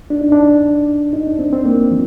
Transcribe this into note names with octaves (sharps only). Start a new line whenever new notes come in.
D4
D#4
D4
D#4
D4
C4
C4
A#3
F3